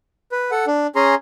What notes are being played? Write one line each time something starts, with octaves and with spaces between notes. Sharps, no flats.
B4
A4 F#5
D4
C#4 G#4 A#5 C6